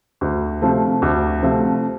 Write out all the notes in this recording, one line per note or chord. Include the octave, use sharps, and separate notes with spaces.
D2
C3 F3 A3
D2
C3 F3 A3